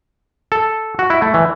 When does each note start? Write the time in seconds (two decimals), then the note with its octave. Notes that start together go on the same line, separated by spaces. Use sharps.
0.52 A4
0.99 F#4
1.10 E4
1.22 A3
1.34 E3